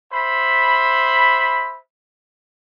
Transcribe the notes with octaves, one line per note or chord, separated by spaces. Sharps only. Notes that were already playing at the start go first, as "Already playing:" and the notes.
C5 E5 B5